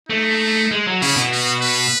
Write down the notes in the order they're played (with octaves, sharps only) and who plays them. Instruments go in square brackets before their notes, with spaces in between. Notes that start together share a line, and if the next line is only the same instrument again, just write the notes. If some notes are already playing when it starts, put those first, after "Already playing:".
[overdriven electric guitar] A3 [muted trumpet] D#4
[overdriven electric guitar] G#3
F#3
[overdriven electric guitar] C#3 [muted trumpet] E4
[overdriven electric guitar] B2
[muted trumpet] F#4
B4